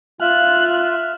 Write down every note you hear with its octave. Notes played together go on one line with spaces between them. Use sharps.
F4 E5 F5 F6 F#6